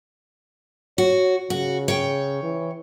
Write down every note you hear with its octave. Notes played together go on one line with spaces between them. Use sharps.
F#4 C#5
C#3 F#4
C#5 G5
E3